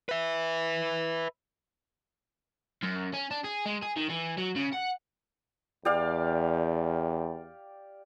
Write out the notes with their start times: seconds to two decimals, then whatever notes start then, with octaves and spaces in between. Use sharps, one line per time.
0.09 B4 E5
2.83 F#2
3.14 C#4
3.31 D4
3.44 G#4
3.66 G#3
3.82 G#4
3.96 D#3
4.09 E3
4.37 F#3
4.56 C#3
4.73 F#5
5.85 E2 G4 D5 F5